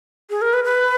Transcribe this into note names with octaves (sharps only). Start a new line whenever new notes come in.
G#4
A#4
B4
B4